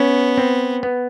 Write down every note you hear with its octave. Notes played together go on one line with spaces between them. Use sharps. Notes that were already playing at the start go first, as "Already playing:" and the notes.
Already playing: B3 C#4
C4
B3